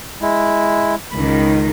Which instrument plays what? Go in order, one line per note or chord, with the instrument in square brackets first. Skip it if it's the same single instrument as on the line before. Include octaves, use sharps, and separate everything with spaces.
[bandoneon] G#3 E4
[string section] C#2 D#3 [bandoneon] B5